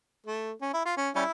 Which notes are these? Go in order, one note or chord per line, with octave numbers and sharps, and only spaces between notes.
A3
C#4
E4
F4
C#4
G3 C#4 E4